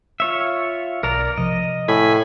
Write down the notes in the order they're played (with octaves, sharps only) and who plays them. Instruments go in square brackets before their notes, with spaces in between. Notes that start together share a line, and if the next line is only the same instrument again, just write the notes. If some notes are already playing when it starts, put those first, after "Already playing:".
[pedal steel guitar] F4 C#5 E5
[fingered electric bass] B1 [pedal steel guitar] A#4 D5 A#5
[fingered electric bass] C3 F3 [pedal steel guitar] D#5
[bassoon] A2 [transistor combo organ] G#5 B5